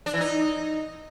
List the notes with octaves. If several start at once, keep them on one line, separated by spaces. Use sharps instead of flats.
D4
E3
D#4